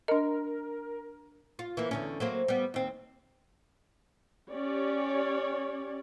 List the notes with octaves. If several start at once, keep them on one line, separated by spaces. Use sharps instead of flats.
D4 A#4 D#5
F4
E3 A#3
E2 D3 C#4
F#3 A#3 C4
G3 B3
D#2 C4
C#4 G4 C#5 D5